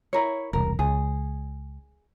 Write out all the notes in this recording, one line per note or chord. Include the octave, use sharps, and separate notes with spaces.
E4 A#4 C#5
E1 C2 A#4
C#2 G#4